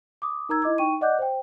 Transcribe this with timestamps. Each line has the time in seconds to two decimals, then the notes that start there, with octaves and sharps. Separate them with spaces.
0.22 D6 D#6
0.49 D#4 A#4 A#5 E6 G#6
0.62 E4 D#5 D6 G#6
0.78 D#4 G5 C#6 D#7
1.01 D5 D#5 F#5 D6 F#6 G6
1.19 C5 G5